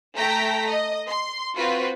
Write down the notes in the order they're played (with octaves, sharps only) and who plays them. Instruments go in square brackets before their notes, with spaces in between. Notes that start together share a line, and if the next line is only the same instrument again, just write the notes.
[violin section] A3 A4 G5 A#5 B6
D#5
C6
C4 F4 F#4 B4